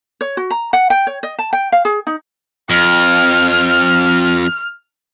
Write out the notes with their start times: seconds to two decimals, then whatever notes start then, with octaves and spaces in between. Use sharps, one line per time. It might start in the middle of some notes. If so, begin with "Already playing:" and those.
0.21 C#5
0.37 F#4
0.50 A#5
0.73 F#5
0.90 G5
1.07 C#5
1.23 D#5
1.39 A5
1.53 G5
1.72 F5
1.85 G#4
2.07 D#4
2.70 F2 F6